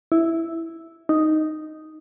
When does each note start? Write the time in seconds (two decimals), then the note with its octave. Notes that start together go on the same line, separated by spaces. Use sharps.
0.12 E4
1.09 D#4